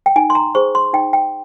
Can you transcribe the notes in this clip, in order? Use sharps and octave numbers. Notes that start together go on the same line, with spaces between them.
G5
D#4 G#5
C6
A#5
G#4 C5 C#6
C6
D#4 G5
G5